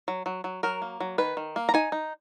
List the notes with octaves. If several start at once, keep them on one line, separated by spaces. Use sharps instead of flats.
F#3
F#3
F#3
F#3 A#4
A#3
F#3
D#3 B4
D#3
A#3
A#5
D#4 G#5
D#4